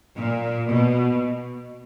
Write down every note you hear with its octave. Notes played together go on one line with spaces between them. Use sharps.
A#2
B2